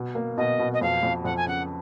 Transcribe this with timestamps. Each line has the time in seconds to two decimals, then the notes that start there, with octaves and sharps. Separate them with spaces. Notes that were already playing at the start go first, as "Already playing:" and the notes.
Already playing: B2
0.15 A#3
0.37 B2 D#5
0.59 B2
0.73 D#5
0.81 F2 F5
1.03 F2
1.25 F2 F#5
1.37 G#5
1.47 C#3 F#5